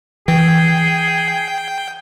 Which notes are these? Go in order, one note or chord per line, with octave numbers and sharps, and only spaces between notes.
E3 G#4 G5